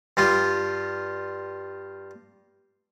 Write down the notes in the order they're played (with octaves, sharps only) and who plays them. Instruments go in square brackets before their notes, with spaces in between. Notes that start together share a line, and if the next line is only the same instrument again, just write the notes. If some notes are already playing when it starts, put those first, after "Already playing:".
[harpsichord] G2 G3 F4